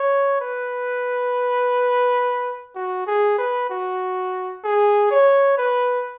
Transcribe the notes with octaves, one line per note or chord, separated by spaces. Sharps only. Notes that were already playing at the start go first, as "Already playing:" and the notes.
Already playing: C#5
B4
F#4
G#4
B4
F#4
G#4
C#5
B4